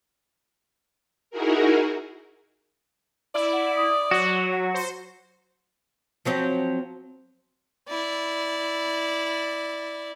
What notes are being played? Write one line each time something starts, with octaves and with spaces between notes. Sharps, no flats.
D#4 E4 F#4 G#4 A#4
E4 D5
F#5
D#6
F#3 F#4
F#5
C5
F3 F#3 C4
E4 D5